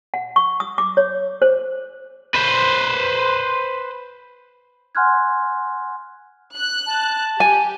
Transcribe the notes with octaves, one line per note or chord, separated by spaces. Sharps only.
F#5
C#6
D#6
D6
C#5
C5
B4 C5
F#5 G#5 C6 F6 F#6 G#6
F#6
A5
G4 G#5